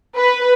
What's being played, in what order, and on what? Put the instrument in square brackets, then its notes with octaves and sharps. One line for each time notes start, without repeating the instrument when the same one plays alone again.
[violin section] B4